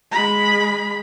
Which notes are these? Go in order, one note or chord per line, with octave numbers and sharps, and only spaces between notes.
G#3 B5